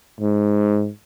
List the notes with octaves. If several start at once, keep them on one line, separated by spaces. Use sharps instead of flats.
G#2